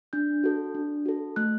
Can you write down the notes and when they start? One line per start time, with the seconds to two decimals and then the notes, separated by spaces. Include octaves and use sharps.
0.13 D4 G6
0.44 F#4 A4
0.75 D4
1.06 F#4 A4
1.36 A3 F#6